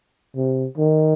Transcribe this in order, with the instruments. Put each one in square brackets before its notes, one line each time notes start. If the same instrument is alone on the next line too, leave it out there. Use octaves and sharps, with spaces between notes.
[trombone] C3
D#3